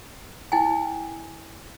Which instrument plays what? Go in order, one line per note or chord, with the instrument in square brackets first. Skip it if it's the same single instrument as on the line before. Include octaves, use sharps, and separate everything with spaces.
[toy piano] E4 G5 G#5